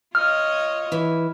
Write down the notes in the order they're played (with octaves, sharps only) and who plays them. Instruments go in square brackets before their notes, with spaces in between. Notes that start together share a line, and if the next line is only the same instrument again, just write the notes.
[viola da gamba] F4 C#5 D#5 [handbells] F6
[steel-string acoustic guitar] E3